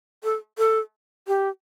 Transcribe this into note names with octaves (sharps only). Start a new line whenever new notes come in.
A4
A4
G4